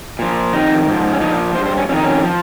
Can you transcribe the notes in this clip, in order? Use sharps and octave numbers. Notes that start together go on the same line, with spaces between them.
A#2 F3
F2 D#3 D#4
G#2 F3
C#4
A#2 F3 D#4
D#3 C5
G2
C5
C#4
F2 D#3 C#4 D#4
C#4
F3